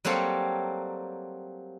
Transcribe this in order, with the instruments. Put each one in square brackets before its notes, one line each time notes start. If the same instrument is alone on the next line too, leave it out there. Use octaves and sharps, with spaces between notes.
[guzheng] F#3 G3 A#3 C4 A4 C#5